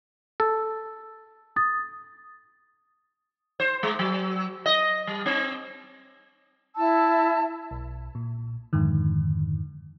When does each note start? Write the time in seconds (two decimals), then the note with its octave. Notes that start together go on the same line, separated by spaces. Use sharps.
0.40 A4
1.56 D#6 A6
3.60 C5
3.83 G#3
3.99 F#3
4.66 D#5
5.07 G3
5.26 C4
6.76 E4 A5 E6
7.71 B1
8.15 A#2
8.73 F2 G#2 D3 D#3